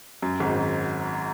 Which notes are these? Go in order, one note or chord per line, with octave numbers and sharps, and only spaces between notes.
F#2
G#1 G#2